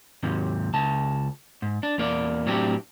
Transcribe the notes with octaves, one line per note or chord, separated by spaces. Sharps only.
D#2 G#2 C3
C#2 A5
G#2
D4
E2 A#3 D5
A2 F#3 C4 D4 G4